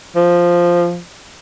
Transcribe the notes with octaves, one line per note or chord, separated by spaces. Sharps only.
F3